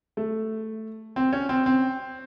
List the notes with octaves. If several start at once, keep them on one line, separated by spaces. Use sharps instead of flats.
A3
C4
C#4
C4
C4